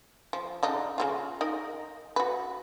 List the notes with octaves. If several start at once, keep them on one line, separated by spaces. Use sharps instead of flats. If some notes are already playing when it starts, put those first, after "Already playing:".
F3
C#3 D4 D#4
C#3 E4 F4
D#4 A#4 D#5
F#4 B4